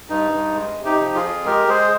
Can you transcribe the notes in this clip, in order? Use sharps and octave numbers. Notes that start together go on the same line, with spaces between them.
G2 D#4
G2
G#3
C3
D#4 G4
F3
F4 G#4
F2
G#3 G4 A#4
G#3 G#4 C5